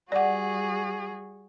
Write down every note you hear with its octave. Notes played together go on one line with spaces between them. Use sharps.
G3 F#4 G#4 D5 F#5